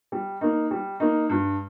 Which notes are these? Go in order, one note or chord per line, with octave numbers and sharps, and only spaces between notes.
G3
A#3 D#4
G3
A#3 D#4
G2